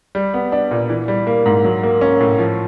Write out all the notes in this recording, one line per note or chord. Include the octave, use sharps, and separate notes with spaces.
G3
B3
D4
A#2
E3
G3
A#3
G#2
F#3
A#3
C#4
A2
F3